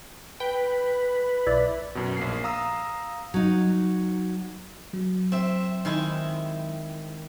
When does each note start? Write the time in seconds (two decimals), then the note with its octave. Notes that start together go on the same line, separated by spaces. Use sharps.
0.40 B4 G5
1.46 B1 E4 D5
1.95 F#2 B2
2.17 A#1 A#3 C7
2.44 F5 A#5 D#6 E6
3.34 F#3 D#4
4.93 F#3
5.32 C4 E5
5.85 D#3 G#3 E4